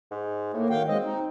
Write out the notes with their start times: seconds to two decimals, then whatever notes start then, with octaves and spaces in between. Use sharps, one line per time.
0.11 G#2
0.54 A2 A#3
0.70 D#3 F#3 F5 G5
0.88 G#3 C4 D#5
1.04 D#4